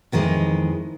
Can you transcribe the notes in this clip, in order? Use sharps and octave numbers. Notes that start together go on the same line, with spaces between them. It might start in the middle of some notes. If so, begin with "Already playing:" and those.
F2 D#3 E3 G#3